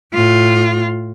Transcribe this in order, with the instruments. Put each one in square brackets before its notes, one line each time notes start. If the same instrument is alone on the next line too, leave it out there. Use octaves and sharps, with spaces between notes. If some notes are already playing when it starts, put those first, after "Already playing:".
[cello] A2 F4